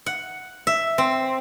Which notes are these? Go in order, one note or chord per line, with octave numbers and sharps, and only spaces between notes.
F#5
E5
C4